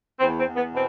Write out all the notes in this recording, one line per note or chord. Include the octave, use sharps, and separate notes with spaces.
E2 C4
C4
E2
B3
B2 C4